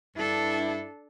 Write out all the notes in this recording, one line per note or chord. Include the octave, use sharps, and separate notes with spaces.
G2 D4 E4 A4